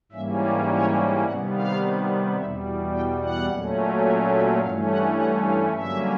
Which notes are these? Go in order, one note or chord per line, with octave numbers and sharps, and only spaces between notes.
G#2 E3 G3 A#3 C#4 E5
D5
C#5
C3 D#3 G3 B3 F#5
F5
E2 B2 G3 E5
G5
F#5
A#2 F#3 A3 C#4
E5
E5
G2 E3 A3 C#4 F5
F#5
F#5
F5
G2 D3 F#3 A#3 C#4 E5